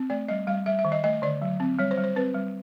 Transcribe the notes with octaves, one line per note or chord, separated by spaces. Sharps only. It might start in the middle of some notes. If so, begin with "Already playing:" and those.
Already playing: C4
A3 D5
G3 D#5
G3 F5
G3 E5
E5
D#3
D#5
A3 D#5
D3 D5
F#3
C4
G3 C#5
C5
G3
C5
C4 B4
G3